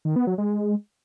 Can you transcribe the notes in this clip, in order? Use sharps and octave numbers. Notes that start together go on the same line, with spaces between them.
D#3
B3
F#3
G#3